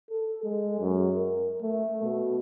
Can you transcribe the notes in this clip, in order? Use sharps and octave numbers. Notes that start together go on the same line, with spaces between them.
A4
G#3
F#2
A#4
A3
B2